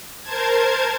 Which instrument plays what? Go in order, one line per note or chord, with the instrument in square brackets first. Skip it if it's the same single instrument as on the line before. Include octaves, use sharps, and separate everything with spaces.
[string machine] A#4 C5 A5 G#6